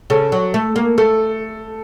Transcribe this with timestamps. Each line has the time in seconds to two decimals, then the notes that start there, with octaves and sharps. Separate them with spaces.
0.10 C#3 A4
0.32 F#3
0.54 A3
0.76 A#3
0.98 A3 A4